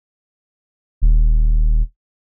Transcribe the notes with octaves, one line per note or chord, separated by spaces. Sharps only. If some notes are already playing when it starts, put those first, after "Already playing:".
D#1